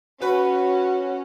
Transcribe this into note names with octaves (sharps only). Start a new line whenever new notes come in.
C#4 F#4 B4